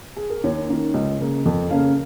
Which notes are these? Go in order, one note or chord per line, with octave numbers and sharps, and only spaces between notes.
G#4
A#4
D#2 C#5
D#3 A#3 C#4
C#2
C#3 A#3
F2
C#3 A#3 C#4 F5